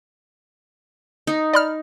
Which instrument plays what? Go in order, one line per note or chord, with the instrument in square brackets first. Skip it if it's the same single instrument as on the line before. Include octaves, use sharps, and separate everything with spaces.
[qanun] D#4
[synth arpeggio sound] D5 B5 F6